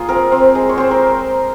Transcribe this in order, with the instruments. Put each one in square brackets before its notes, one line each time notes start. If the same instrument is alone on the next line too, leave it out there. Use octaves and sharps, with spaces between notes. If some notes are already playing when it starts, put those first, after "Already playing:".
Already playing: [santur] A#3 F4 G#4
C4 A#4
C4
G#3
C#5
C4 C5
A#4